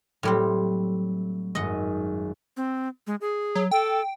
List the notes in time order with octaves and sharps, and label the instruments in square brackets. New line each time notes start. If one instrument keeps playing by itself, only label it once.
[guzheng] A2 G3 C4 [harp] F#3 A3
[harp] G#1 F#2 [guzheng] D#5 F#5
[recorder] C4
G#3
G#4
[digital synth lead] F#3
[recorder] A4 [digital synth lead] G5